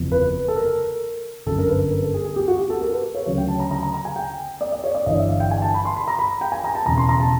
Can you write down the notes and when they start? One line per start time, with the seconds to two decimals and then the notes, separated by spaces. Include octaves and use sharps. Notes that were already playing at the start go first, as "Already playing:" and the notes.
Already playing: F#1 E2 C3 F3
0.12 B4
0.48 A4
0.56 A#4
1.46 G1 F#2 D3 A4
1.59 A#4
1.69 B4
1.91 A#4
2.02 A4
2.14 G#4
2.25 G#4
2.36 G4
2.48 F#4
2.59 G4
2.70 A4
2.81 A#4
2.92 B4
3.15 C#5
3.26 D2 C#3 F#3 C#5
3.38 G5
3.48 A5
3.60 A#5
3.71 A#5
3.83 A#5
3.94 A#5
4.05 G#5
4.16 G5
4.61 D5
4.72 D5
4.84 C#5
4.95 D5
5.06 G1 G2 E3 D#5
5.18 E5
5.29 F5
5.40 G5
5.51 G#5
5.62 A5
5.74 B5
5.85 C6
5.96 B5
6.08 A#5
6.19 B5
6.41 G5
6.52 G#5
6.64 A#5
6.75 A5
6.86 E1 E2 C#3 A#5
6.97 C6
7.09 A#5
7.20 A5